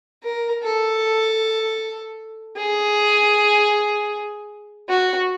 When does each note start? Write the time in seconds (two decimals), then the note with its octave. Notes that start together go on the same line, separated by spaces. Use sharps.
0.24 A#4
0.63 A4
2.56 G#4
4.89 F#4